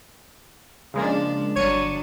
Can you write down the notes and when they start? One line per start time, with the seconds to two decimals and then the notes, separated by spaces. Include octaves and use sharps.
0.94 C#3 F3 G#3 A#3 D4
1.56 G1 F#3 D4 C#5 C#7 D#7